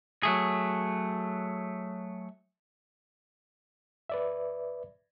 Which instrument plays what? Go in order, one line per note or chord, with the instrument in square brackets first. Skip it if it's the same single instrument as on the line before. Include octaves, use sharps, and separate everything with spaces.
[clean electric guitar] F#3 A3 G#4
[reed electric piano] B4 D5 E5